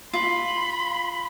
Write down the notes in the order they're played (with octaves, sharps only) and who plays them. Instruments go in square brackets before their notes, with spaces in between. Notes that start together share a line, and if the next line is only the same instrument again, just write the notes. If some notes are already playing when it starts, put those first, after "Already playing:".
[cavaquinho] F4 [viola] B5 C6